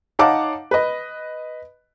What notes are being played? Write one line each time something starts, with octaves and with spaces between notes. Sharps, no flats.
D#4 C#5 F5 F#5 A5 D6
B4 D#5